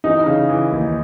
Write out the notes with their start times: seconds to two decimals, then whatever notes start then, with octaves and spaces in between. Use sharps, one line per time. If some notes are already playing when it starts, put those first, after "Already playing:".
0.04 E3 D#4
0.26 C#3
0.49 E3
0.71 D#2